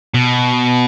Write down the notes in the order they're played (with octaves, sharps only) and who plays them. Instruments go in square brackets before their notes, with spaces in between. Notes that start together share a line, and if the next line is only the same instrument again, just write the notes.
[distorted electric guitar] B2